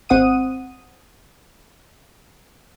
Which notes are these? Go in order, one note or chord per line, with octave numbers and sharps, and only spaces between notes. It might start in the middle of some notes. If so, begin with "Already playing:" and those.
G#1 C4 F#5 D#6 D#7